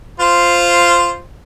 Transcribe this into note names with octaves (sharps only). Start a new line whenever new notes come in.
F4 C5